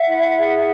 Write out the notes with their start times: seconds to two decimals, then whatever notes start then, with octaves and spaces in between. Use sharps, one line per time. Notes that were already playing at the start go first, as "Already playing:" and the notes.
Already playing: E5 F#5
0.09 E4
0.37 G#4